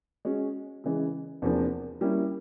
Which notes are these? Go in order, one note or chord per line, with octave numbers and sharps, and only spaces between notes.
G#3 C#4 F#4
C#3 E3 G#3
E2 C3 F3 A#3 D4
G3 A#3 C#4 E4